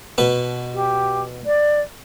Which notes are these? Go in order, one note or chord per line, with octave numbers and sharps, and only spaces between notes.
B2 B4
G4
D5